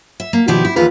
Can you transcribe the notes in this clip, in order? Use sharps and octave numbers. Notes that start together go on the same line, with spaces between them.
E5
A#3
B2 D#3 F3 E4 G4 D5
E4
D#2 E3 F3 F4 G#4 B4